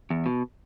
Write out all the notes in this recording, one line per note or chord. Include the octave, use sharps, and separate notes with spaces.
E2
B2